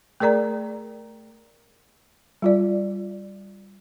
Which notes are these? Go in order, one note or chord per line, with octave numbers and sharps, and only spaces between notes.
A3 G#4 A#4 D5 A#5
G3 F4 D5